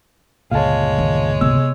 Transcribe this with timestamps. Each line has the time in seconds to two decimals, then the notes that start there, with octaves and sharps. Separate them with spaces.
0.51 G1 C#2 A#2 G#3 C#5 F5 A5
0.98 D#3 D#4
1.41 C3 B3 E6